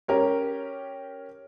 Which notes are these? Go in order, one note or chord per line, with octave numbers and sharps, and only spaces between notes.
C#4 G4 A#4 C#5